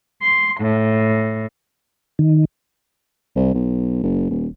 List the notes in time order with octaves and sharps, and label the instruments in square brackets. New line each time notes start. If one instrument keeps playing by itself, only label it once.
[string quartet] C6
A2
[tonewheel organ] D#3
[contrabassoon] C2
B1
F#1
D#1